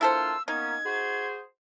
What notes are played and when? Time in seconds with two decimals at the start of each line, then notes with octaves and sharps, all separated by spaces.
0.01 A#3 D4 E4 F4 A4 C5 E6
0.48 A#3 B3 C#4 D#4 G#6
0.86 F#4 G#4 C5